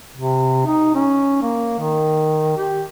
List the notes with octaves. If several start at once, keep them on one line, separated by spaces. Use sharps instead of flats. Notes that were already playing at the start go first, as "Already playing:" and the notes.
C3
D#4
C#4
A#3
D#3
G4